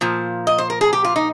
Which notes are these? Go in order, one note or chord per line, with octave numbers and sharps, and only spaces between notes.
A#2 F3
D#5
C5
A#4
G#4
G4
F4
D#4